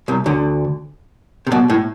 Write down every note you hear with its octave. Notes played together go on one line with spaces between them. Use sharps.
C2 C3
D2 D3
C3
B1 B2
A2